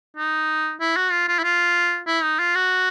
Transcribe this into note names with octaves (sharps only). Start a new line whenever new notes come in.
D#4
E4
F#4
F4
F4
E4
F4
E4
D#4
F4
F#4